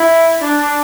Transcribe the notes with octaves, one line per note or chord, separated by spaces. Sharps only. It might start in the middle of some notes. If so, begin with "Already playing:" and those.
Already playing: E4
D4